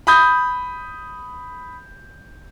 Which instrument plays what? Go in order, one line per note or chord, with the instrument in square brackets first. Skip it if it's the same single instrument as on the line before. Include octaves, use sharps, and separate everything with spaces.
[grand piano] B5 D#6 G6